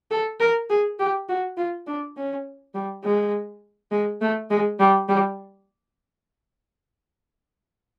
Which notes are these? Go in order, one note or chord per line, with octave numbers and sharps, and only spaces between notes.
A4
A#4
G#4
G4
F#4
F4
D4
C#4
G3
G#3
G#3
A3
G#3
G3
G3